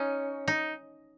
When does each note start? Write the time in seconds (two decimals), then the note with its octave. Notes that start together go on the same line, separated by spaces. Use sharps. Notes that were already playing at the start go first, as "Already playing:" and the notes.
Already playing: C#4 D#4
0.48 D#4